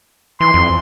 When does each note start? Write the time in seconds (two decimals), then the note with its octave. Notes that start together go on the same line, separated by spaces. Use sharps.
0.40 E3 C6
0.54 F2